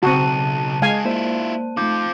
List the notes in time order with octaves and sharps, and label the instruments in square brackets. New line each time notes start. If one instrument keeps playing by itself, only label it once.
[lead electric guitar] B1 [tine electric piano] C#3 [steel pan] C4 F#4 [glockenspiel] A5 F#6 D#7
[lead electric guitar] C#2 G#4 [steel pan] G#3 F5 G#5
[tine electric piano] A#3 C5 D5 [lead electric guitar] E4 F4
[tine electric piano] A3 D#4 [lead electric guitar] C4 F4 [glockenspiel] D6 G6